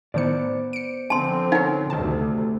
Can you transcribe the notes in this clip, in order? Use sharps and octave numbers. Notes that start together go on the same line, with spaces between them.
A2 D#3 B3 C5 D5 C#7
C#7 D7
D3 F3 C4 A5 C6
D#4 A#4 C#5 F#5
D2 C3 D#3 A5